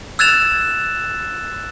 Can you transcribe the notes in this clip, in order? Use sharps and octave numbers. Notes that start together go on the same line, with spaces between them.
E6 F#6 G#6 A6 E7 F7